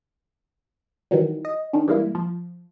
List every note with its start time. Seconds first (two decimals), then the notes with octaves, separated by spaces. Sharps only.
1.11 D#3 E3 F#3 G3
1.45 D#5
1.73 D#3 C#4 D4
1.88 E3 G3 G#3 A#3 E4
2.15 F3